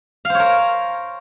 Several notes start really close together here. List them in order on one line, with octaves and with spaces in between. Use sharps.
F5 C5 C#5 A#4